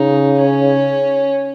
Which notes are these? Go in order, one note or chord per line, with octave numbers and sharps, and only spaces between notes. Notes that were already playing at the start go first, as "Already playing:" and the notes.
Already playing: C#3 D#4
C#4